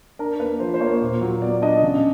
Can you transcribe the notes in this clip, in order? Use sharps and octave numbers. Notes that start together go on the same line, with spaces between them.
D4 A#4
A#3 B4
F3 C5
C5
A#3 C#5
A#2
F#3
B3 D5
D4 D#5
C#3